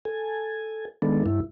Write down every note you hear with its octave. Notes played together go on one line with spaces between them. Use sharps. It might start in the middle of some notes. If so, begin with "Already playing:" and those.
A4 G#5
D#3 G#3 B3 D4 A4
G2 E4